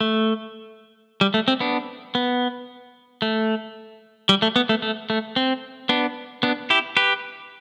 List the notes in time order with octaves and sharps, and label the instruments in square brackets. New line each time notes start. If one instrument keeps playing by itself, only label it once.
[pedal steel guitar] A3
G3
A3
C4
B3 D4
B3
A3
G3
A3
B3
A3
A3
A3
C4
B3 D4
B3 D4
E4 G4
G4 B4